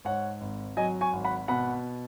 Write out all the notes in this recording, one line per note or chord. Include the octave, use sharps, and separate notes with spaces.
G#2 C#5 F#5
G#1
F#3 D#5 G#5
G#5 C#6
G#1
F#5 B5
B2 F#5 B5